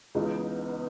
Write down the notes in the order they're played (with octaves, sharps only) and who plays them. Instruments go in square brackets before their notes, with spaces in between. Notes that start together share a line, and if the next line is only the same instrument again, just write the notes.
[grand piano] C#2 C#3 E3 G#3 [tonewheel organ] B3 D#4